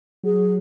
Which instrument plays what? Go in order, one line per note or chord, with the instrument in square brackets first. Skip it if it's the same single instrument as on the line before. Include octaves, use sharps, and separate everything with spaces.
[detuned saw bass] F#3 [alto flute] G#4